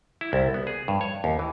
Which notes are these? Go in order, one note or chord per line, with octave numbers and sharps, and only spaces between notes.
E4
C2
B3
G#4
G2
C#5
D#2
E3